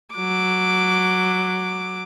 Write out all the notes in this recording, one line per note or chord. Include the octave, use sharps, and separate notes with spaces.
F#3 D6